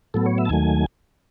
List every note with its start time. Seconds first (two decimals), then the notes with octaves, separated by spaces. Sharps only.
0.14 A2 F#3 B3 A4
0.26 C#5
0.38 E5
0.45 A5
0.49 D#2 D#3 F#3 A3 G#5